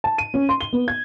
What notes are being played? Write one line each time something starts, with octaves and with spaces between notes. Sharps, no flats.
A5
D#7
C#4
C6
G7
B3
G#6